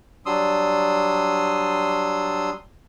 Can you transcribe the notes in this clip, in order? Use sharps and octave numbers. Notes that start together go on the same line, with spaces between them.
F#3 G3 D4 C6 D#6 E6